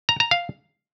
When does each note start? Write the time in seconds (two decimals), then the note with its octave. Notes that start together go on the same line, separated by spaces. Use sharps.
0.09 A#5
0.20 A#5
0.31 F5